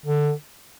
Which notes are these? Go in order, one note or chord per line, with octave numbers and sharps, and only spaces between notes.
D3